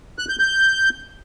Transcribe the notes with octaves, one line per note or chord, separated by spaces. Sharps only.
F#6
G6
G6